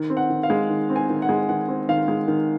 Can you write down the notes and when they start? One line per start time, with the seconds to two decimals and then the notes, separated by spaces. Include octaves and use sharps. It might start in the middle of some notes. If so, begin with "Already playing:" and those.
Already playing: D#3
0.10 C4
0.17 F#5
0.30 D#3
0.43 F5
0.50 G#3
0.70 D#3
0.90 C4
0.96 G#5
1.09 D#3
1.22 F#5
1.29 G#3
1.49 D#3 F#5
1.68 C4
1.88 D#3 F5
2.08 G#3
2.28 D#3